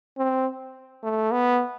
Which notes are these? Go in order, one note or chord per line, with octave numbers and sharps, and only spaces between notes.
C4
A3
B3